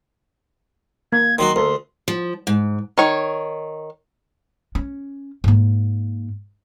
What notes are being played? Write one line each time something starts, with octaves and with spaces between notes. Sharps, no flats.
A#3 G#6
D#3 F#3 F#4 C6
D2 A4 A#4 C6
F3
G#2
D#3 C#5
C#4
G#2 A#3